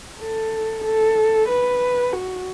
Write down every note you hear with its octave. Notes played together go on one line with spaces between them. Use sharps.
A4
A4
B4
F#4